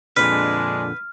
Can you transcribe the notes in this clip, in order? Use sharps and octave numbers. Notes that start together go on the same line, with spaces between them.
F2 A#2 D3 G#3 D4 B4 F6